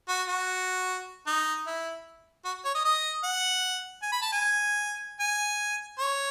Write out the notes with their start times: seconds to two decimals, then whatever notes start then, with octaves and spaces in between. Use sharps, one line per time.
0.09 F#4
0.28 F#4
1.27 D#4
1.67 E4
2.45 F#4
2.65 C#5
2.75 D#5
2.85 D#5
3.24 F#5
4.02 G#5
4.12 B5
4.22 A5
4.32 G#5
5.20 G#5
5.99 C#5